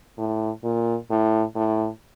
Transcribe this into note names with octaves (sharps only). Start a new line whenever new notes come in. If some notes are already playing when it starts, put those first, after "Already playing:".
A2
A#2
A2
A2